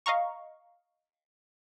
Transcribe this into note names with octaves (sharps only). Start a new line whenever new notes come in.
D#5 F5 A#5 C#6